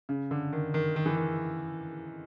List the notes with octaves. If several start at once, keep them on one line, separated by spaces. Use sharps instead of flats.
C#3
D3
D#3
D#3
D#3
E3
D#3